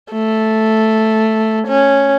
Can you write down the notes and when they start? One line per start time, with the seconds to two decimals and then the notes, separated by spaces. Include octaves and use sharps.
0.12 A3
1.68 C#4